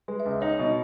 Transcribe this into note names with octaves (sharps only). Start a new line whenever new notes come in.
G#3 B4
E5
C#2
D#5
D#4 C#5
D#5
B2